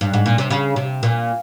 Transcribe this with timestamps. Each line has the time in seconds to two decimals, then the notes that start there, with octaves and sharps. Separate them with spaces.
0.01 G2
0.13 G#2
0.26 A#2
0.38 C3
0.50 C#3
0.76 C3
1.03 A#2